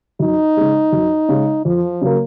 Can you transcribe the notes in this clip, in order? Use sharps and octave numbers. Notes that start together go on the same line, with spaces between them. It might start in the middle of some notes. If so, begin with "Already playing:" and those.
F#2 D#4
C#3 G#3
F#2
C#3 G#3
F2 F3
C#3 F#3 A#3